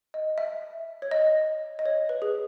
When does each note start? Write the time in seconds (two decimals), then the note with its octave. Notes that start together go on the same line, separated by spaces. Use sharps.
0.14 D#5
0.38 E5
1.02 C#5
1.11 D#5
1.79 D#5
1.85 C#5
2.09 B4
2.22 G#4